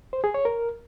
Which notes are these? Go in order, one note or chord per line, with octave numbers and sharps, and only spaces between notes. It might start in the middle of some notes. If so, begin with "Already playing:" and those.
C5
G#4
C#5
A#4